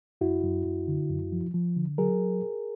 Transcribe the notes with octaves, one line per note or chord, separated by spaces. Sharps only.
F#2 E4 F#4
F#2
F#2
D3
F#2
F3
F3
D3
F#3 G#4 A#4